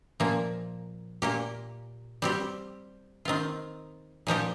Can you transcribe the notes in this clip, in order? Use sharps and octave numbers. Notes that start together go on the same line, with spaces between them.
A#2 F3 A#3
A#2 A#3 G4
G3 C4 G4
D#3 C4 F4
A#2 F3 D#4 G4